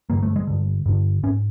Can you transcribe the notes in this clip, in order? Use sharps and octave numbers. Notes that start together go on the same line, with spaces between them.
G2 D3 A#3
A3
G#3
G2 D3
G2 D3
G#2 C#4